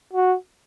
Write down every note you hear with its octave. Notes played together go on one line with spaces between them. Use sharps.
F#4